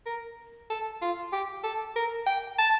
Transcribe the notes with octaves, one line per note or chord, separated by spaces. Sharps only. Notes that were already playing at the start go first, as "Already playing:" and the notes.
A#4
A4
F4
G4
A4
A#4
G5
A5